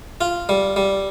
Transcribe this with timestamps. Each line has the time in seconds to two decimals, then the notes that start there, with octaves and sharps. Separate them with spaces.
0.21 F4
0.49 G3
0.76 G3